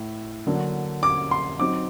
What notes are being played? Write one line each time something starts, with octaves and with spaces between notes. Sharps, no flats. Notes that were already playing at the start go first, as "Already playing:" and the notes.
Already playing: A2
D3 F#3 A#3 D4
D6
C6
F#3 C4 D#4 D6